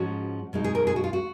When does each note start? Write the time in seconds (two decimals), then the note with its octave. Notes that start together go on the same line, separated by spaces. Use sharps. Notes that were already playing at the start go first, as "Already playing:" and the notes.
Already playing: G#2 F3 G#3 C#4 F#4
0.53 B2 G#3 D#4
0.64 G#4
0.75 A#4
0.87 G#4
0.96 F#4
1.04 F4
1.13 F#4